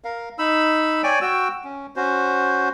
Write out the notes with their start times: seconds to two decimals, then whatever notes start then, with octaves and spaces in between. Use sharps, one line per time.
0.04 A#4 F5
0.39 D#4 B5 E6
1.03 C#5 D5 G5 G#5
1.21 F#4 G5 E6
1.64 C#4
1.96 C#4 F#4 C5